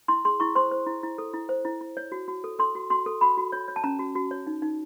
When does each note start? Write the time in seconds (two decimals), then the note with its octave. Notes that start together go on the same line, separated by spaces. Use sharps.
0.08 E4 C6
0.25 G#4 C6
0.40 E4 C#6
0.55 C5 C6
0.71 C5
0.86 E4
1.03 E4
1.18 A4
1.34 E4
1.49 C5
1.65 E4
1.81 E4
1.97 C#5
2.12 F#4
2.28 F#4
2.44 A4
2.59 A4 C6
2.75 F#4
2.90 F#4 C6
3.06 A4
3.21 F#4 B5
3.37 F#4
3.52 C#5
3.68 C#5
3.76 A5
3.84 C#4 A#5
3.99 F#4
4.15 F#4
4.31 C#5
4.47 D#4
4.62 D#4